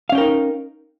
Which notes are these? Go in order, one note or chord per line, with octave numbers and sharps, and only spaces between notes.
C#4 D#4 A#4 F5 G5